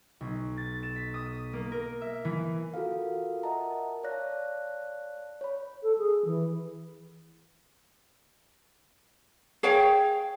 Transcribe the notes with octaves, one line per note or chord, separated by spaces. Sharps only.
B1
A6
E7
B6
D#6
A#3
A#4
E5
E3
F4 F#4 A4 A#4 F5
A#4 D#5 E5 F#5 A5 A#5
C#5 D5 F5 A5 F#6 A#6
C#5 B5
A4
G#4
E3
G#4 C#5 F5 G5